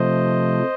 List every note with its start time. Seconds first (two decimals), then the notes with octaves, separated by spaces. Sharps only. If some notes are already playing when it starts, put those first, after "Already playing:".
Already playing: C3 F3 A3 C5 D#5